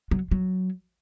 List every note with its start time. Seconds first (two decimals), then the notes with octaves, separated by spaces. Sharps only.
0.11 F#3
0.31 F#3